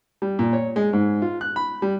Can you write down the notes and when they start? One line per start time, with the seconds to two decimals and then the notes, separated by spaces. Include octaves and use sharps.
0.22 G3
0.39 A#2
0.53 C#5
0.76 G#3
0.93 G#2
1.22 F4
1.41 F#6
1.56 B5
1.82 G3